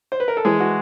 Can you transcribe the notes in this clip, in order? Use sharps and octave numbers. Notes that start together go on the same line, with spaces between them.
C5
B4
A#4
A4
E3 G#3 G#4
F#4